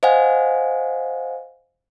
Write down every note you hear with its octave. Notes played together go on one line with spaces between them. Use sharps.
C5 D#5 F5 F#5 G#5